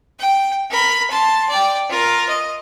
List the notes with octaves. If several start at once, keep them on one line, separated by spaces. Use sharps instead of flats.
G5
A#4 B5
A5 C6
D5 G5
F4 A#4
D#5